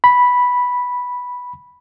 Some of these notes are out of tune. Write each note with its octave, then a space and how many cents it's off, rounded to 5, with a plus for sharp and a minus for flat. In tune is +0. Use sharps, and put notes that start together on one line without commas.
B5 -5